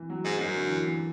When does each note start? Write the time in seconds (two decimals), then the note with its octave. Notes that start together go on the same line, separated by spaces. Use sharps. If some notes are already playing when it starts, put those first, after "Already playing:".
Already playing: E3
0.10 F#3
0.24 G#2 G#3
0.39 F#2 F#3
0.54 D3
0.69 E3
0.85 E3